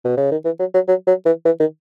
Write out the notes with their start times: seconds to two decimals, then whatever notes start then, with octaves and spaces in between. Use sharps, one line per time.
0.05 B2
0.17 C#3
0.32 D#3
0.45 E3
0.59 F#3
0.74 F#3
0.88 F#3
1.07 F#3
1.26 E3
1.45 E3
1.60 D#3